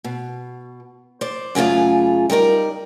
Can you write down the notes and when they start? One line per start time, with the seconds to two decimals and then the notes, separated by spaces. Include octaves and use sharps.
0.04 B2
1.21 C5 D5
1.55 F#2 C#3 A3 F4 G#4
2.30 G3 D#4 A#4 D5